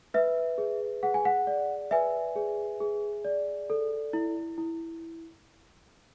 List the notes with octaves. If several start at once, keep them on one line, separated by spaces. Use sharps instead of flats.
B4 E5
G#4
G#4 F#5
G#5
F#5
D5
B4 E5 G#5
G#4
G#4
D5
A4
E4
E4